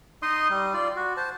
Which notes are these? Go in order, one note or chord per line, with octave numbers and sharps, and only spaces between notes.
D#4 D#5 C6 D#6
G3
F4 D5
F#4
C5 A5